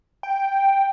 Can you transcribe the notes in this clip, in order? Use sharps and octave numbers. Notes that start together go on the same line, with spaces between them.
G5